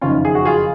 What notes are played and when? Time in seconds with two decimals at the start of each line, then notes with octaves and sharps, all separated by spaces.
0.01 F#1 F2 D#3 C#4 F4
0.25 G#4
0.35 F#4
0.45 F4 G#4